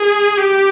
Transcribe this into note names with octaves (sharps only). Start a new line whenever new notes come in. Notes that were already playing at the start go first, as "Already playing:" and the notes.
Already playing: G#4
G4